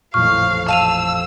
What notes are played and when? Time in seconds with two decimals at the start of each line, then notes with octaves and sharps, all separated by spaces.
0.14 A1 F2 A#2 F5 C#6 F6
0.68 F5 A5 E6 D#7 F7